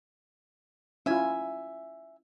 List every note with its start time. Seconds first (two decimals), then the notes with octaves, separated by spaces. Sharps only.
1.06 C#4 E4 F4 E5 G#5